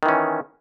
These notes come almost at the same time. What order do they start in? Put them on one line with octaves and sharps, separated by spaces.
D#3 E3 C#4